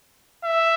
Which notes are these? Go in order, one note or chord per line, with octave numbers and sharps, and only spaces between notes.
E5